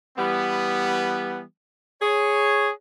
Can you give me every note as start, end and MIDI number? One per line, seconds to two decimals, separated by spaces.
0.17 1.42 52
0.17 1.42 55
0.17 1.42 59
2.01 2.69 68
2.01 2.69 73